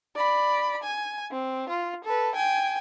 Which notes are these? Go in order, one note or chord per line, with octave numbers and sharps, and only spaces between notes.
D5 B5
G#5
C4
F4
A4 B4
G5 G#5